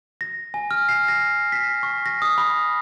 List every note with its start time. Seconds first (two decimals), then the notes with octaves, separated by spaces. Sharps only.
0.21 A#6
0.54 G#5
0.71 F6
0.89 C7
1.08 A#6
1.52 B6
1.83 C#6
2.06 A#6
2.22 D#6
2.38 B5